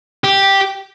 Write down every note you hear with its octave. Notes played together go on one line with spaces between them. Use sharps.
G4